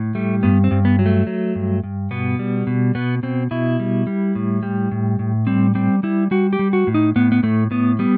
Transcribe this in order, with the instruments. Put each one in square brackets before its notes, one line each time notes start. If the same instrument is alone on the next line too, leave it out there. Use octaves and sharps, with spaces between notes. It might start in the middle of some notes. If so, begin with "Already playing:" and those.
Already playing: [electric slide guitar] A2
G3 A3
G2 B3
C4
G2
B3
F#3
A3
F#3
G2
G2
B2 B3
G3
B2
B2 B3
B2 C4
B2 E4
G3
G3
A2
G3
A2
A2
G3 C4
G3 C4
G3 E4
G3 F#4
G4
G3
F#4
A2
D#4
A2 B3
B3
A2 A3
A2 B3
G3 B3